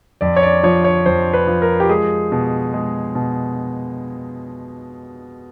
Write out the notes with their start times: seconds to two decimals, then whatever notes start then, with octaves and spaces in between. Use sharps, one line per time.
0.21 F2 D5
0.36 C#5
0.43 D5
0.63 F3 C#5
0.84 C#5
1.06 F2 C5
1.34 B4
1.47 F3
1.62 A#4
1.80 G4
1.89 G#3 G#4
2.32 B2
2.74 G#3
3.15 B2